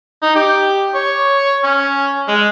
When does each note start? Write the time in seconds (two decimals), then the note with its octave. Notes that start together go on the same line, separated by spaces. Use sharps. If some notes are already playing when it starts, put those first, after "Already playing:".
0.22 D#4
0.35 G4
0.94 C#5
1.64 C#4
2.28 G#3